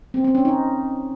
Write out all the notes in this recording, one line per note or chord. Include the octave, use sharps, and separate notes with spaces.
C4
C4
C#4
D#4